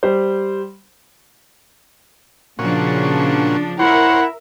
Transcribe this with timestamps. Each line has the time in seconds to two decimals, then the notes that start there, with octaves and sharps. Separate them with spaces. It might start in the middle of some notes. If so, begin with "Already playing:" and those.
0.03 G3 C5
2.59 A#2 C#3 F3 C#4 D4 F#4
3.79 E4 A#4 C5 C#5 E5 F#5